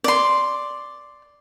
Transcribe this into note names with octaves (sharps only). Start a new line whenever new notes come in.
D5 C6